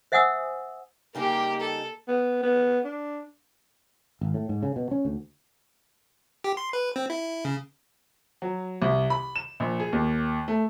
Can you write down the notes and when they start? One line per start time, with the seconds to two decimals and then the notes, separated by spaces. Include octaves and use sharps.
0.12 C5 E5 F#5 G#5 D#6 E6
1.15 C#3 G3 A#3 D#4 G4
1.61 A4
2.08 B3
2.43 B3
2.85 D4
4.21 G#1
4.34 A2
4.49 G#2
4.63 C#3
4.76 B2
4.91 C#4
5.05 D2
6.44 G4
6.57 C6
6.73 B4
6.96 C4
7.10 E4
7.45 C#3
8.42 F#3
8.82 C2
9.10 B5
9.36 E7
9.60 A#1
9.80 G#4
9.92 D#2
10.48 A3